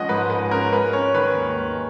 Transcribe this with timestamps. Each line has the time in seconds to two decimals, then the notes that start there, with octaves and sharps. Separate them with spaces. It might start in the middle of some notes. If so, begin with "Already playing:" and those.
Already playing: F3 G#3 C#4 D#5 F#5
0.09 G#2 B4
0.30 G#3 B4
0.51 C#4 A#4
0.72 G#3 B4
0.93 C#4 C#5
1.14 D#3 B4
1.36 D#2
1.57 G#3